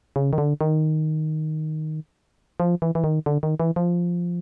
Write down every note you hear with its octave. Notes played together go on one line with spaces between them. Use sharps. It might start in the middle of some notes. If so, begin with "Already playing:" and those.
C#3
D#3
D3
D#3
F3
E3
E3
D#3
D3
D#3
E3
F3